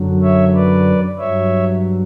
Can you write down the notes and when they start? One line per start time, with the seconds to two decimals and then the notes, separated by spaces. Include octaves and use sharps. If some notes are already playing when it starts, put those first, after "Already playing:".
Already playing: F#2 D3 F#3
0.22 C#5 E5
0.54 B4 D5
1.19 G2 F#3 C#5 E5